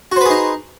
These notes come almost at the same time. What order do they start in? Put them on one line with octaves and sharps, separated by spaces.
F#4 C5 B4 G#4 D#4